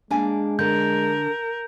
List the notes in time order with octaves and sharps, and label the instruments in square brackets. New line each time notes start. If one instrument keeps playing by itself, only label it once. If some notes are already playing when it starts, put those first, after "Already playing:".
[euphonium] G#3 [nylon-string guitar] A#3 D4 G#5
[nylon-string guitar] D3 [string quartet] A#4 [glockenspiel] G6